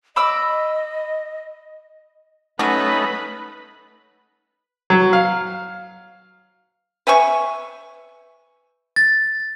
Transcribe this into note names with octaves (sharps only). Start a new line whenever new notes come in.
D#5 B5 D6 E6
F#3 A3 C#4 D#4 B4 B5
F#3
F5
B4 E5 G#5 C#6
A6